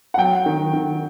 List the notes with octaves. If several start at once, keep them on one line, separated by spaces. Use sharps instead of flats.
F#5
F#3 G5
D#3
D#3